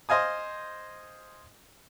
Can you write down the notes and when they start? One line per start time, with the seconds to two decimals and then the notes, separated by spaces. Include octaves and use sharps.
0.09 C5 D#5 F5 G#5 D#6